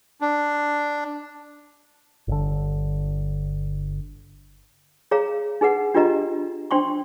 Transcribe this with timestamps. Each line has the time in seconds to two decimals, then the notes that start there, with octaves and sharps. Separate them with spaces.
0.21 D4
2.28 G1 D3
5.11 G#4 C#5 F5 A#5
5.61 D#4 G#4 B4 F#5
5.94 D4 F4 G4 B4 D#5 A#5
6.71 D4 C5 G5 C6 C#6